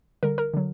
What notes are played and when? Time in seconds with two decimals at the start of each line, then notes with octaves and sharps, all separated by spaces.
0.23 D3 G3 A#4
0.38 A#4
0.54 D3 F#3